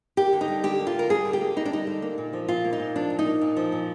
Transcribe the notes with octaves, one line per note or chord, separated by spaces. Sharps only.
A#3 G4
D3
D#4
G3
D3 G4
A#3
F4
D3 A#4
G3 G#4
D3
G4
A#3
D3 D#4
D4
G3 D#4
D3
A#3
A#2
F3
A#2 F4
A#3
D#4
A#2
F3 D4
A#2
D#4
A#3
A#2
F3
A#2